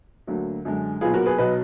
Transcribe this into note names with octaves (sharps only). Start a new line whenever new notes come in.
D2 D3 F#3 A#3
F#2 D3 G#3
B1 A#2 F#3 B3 F4 G#4
F#4 A#4
G#4 B4
B1 B2 F#3 B4 D#5